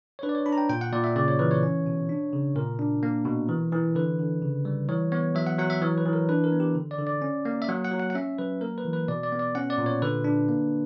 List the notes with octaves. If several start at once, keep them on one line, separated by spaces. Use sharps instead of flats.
C#5
D4 B4
D5
C#5
D4 B5
A#5
G5
A#2 G5
F#5
A#2 D5
E5
C#3 D5
C#5
E3 B4
C#5
C#4
B2
D4
C#3
A#2 A#4
D4
A#3
B2
E3
E3
D3 B4
D3
C#3
G3
E3 C#5
B3 C#5
F#3 E5
F#5
F#3 F#5
E5
E3 C#5
B4
E3
A#4
D4 B4
A#4
B3
G4
D3
D5
D3
D5
C#4
A#3
E5
F#3 F#5
F#5
F#3
F#5
F#5
C#4 E5
F#3 B4
A#3 A#4
B4
E3
B4
B2 D5
D5
B3
D5
C#4 F#5
D5
A#2
C#5
D3 B4
D4
A#3